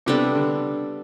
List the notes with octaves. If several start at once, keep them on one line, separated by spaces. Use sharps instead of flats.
C3 G3 B3 D4 A4
D3